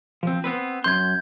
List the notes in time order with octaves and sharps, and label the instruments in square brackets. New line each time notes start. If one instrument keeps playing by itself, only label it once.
[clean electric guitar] F3 C4
B3 C4 B4
[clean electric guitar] F#2 C6 [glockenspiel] G6 G#6